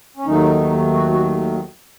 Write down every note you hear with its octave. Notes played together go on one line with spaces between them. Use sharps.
C#4
D#2 D#3 F#3 A3 D#4
F#4
F#4